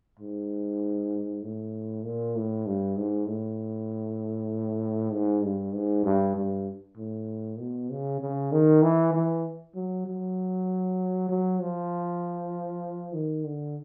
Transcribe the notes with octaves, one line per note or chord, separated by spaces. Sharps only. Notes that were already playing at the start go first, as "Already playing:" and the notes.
G#2
A2
A#2
A2
G2
G#2
A2
G#2
G2
G#2
G2
G2
A2
B2
C#3
C#3
D#3
E3
E3
F#3
F#3
F#3
F3
D#3
D3